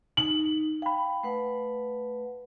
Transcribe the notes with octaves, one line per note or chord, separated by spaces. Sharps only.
D#4 F#7
F5 G5 B5
A3 B4 F#5